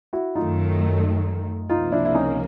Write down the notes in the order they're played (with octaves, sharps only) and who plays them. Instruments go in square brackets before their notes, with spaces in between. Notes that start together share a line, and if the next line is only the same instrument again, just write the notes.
[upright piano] E4 F#4
[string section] F#2 D#3 F#3 A3 [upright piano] D#4 F4
[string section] C#2 C3 F3 A#3 [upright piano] D#4 F4
[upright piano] D4 E4
E4
C#4 D#4